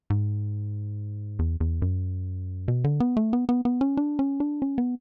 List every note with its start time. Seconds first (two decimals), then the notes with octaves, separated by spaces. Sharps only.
0.10 G#2
1.39 E2
1.60 E2
1.82 F#2
2.68 B2
2.84 D3
3.00 B3
3.17 A3
3.33 B3
3.49 B3
3.65 B3
3.81 C#4
3.97 D4
4.19 C#4
4.40 D4
4.62 C#4
4.78 B3